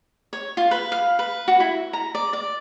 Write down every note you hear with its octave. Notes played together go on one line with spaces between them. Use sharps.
C#5
F4
B4
F5
B4
F#4
E4
A#5
D5
D5